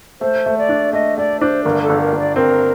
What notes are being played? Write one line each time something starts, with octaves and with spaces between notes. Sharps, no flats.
A3 C5
A3
D5
D4
A3 D#5
A3 D5
D4 C5
G1 A#4
A4
G1
A#4
G1
D5
C4 A#4